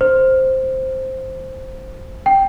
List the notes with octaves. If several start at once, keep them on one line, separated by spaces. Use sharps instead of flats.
C5
G5